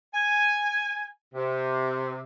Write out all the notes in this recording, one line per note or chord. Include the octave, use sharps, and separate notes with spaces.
G#5
C3